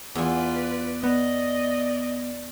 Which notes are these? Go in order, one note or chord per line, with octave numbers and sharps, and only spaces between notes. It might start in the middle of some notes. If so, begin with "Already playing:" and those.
E2 F4 B4 D5 G#5
B3 D5 D#5